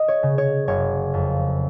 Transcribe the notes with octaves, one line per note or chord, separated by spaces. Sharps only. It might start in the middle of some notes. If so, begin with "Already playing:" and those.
Already playing: D#5
C#5
C#3
C#5
F#1 C#5
F2